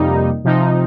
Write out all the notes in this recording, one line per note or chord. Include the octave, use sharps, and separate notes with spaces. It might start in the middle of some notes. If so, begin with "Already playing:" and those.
Already playing: F2 C3 G3 A#3 D#4
C3 F3 D#4